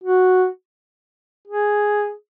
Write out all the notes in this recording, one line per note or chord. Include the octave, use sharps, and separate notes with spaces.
F#4
G#4